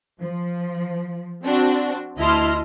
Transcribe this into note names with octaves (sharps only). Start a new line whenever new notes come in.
F3
C4 D4 F#4
D2 E4 D#5 A5 C6 F6